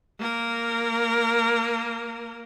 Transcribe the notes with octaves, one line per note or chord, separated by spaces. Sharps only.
A#3 A#4